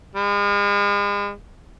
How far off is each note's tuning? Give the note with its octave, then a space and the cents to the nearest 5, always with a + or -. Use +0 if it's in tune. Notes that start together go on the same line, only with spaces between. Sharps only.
G#3 -40